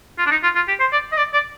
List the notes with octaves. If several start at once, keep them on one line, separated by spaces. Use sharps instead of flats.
F4
D4
D#4
F4
F4
G4
C5
D5
D#5
D5
D5